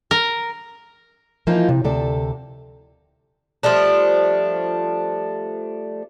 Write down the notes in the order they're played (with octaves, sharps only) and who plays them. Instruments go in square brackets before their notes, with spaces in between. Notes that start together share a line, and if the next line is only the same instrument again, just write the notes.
[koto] A#4
[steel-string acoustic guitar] E3 F3 A#3 D#4 F4
C3
D2 C3 A4 D5
[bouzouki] F3 G3 A3 D4